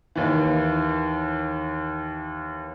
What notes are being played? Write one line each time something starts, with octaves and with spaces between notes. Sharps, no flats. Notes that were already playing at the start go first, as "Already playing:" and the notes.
D#2 E3